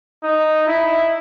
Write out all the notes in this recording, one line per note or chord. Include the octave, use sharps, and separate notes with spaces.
D#4
E4